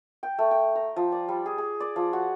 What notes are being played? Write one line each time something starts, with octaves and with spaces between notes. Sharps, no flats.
G5
A3
G5
A#5
F3
D5
G3
G#4
G#4
D5
F3
F#4